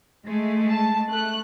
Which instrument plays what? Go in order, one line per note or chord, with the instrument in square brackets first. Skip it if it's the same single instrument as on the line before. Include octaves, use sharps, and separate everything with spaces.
[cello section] G#3 A3
[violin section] A5
A3 F#6